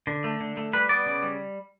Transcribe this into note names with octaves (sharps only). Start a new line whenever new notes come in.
D3
A3
D3
A3
G3 B4
B3 D5
C#3
G3